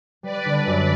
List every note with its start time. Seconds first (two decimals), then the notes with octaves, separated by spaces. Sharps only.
0.23 G3 B4 D5
0.45 D3
0.66 F#2